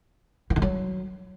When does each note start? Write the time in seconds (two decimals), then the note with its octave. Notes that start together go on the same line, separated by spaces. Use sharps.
0.50 E3
0.56 D#3
0.62 F#3